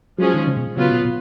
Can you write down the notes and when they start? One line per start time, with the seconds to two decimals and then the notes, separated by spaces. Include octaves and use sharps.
0.18 F3 F#3 G#3 C#4 G#4
0.34 D#3
0.47 C#3
0.57 B2
0.75 C#3 F#3 B3 F4 B4
0.91 B2
1.05 B2